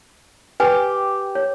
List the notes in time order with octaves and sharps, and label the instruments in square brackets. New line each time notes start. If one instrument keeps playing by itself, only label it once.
[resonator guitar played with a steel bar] G4 [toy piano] B4 G#5
[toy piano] C#5